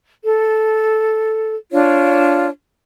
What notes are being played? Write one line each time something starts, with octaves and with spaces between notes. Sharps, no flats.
A4
D4 F4 C#5